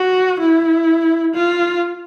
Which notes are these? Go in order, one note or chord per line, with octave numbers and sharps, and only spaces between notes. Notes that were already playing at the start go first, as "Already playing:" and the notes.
Already playing: F#4
E4
F4